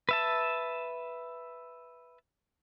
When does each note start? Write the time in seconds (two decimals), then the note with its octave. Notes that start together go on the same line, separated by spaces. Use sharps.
0.09 B4 E5 A5